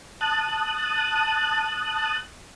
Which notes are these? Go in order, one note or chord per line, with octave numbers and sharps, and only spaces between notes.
A5 D#6 F#6